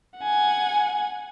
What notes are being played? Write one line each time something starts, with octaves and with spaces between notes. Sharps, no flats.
F#5 G#5